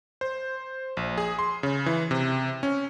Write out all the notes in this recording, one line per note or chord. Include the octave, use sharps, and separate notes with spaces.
C5
A#1
G#4
C6
C#3
E3
C3
C#4